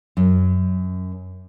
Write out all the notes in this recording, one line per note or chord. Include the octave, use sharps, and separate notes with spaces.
F#2